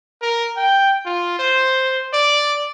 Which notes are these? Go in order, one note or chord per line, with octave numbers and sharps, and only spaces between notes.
A#4
G5
F4
C5
D5